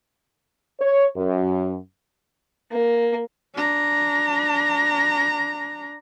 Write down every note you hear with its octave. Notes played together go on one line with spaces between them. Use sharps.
C#5
F#2
A#3
D4 A#5